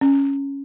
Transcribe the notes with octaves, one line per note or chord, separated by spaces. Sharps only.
C#4